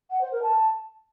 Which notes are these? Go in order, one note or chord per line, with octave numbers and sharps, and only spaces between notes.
F#5
C5
A#4
A5